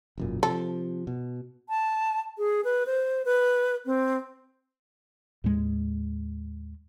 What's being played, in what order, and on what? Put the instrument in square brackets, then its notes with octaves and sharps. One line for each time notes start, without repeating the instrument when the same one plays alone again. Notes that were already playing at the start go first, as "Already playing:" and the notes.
[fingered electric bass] E1 F#2 A#2
[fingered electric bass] C3 F3 [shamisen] A4
[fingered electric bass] B2
[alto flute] A5
G#4
B4
C5
B4
C4
[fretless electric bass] D#2 A2 G#3